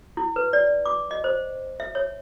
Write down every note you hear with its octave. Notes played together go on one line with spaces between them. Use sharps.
E4
B4
D5
D6
D#5
C5
E5
C#5